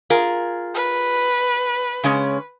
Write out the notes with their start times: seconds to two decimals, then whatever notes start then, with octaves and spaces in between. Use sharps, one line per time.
0.10 F4 G#4 A#4
0.75 B4
2.03 C#3 G#3 C#4